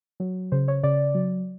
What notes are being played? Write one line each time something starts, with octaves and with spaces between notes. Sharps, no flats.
F#3
C#3 C5
C#5
C#3 D5
F#3